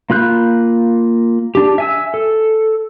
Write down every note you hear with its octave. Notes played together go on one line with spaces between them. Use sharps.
A#3 F4 B5 F#6 G6
D4 G4
E5 G#5 E6
A4